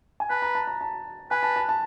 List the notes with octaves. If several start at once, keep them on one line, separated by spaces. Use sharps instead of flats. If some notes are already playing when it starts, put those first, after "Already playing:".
G#5
B4 A5
A#5
A5
A#5
A5
B4 G#5
A5
A5
A5